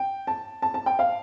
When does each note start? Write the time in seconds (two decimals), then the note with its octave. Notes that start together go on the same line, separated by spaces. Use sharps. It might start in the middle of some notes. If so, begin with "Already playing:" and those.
Already playing: G5
0.27 A5
0.62 A5
0.74 A5
0.86 G5
0.99 F5